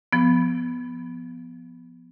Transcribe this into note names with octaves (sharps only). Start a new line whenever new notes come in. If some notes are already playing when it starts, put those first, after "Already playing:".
F3 B3